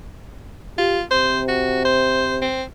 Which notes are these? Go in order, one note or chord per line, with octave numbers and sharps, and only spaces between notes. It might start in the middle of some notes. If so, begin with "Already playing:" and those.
F4 G4
C3 C5
F#4
C5
C4